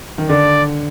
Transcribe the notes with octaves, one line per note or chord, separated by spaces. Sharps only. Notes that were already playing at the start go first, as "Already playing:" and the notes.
D#3
D3 D5